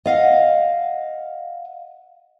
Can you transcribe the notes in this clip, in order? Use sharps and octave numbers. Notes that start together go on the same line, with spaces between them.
D#5 F5 F#5